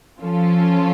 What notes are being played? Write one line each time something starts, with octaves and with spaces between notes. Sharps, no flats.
F3 C#4 F4 A4